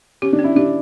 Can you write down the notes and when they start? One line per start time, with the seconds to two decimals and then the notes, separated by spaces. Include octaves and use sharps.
0.22 C#4 G4
0.33 D4
0.39 C#4
0.44 E4
0.56 D4 G4